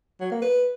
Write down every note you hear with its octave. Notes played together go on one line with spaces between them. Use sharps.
F#3
A#3
B4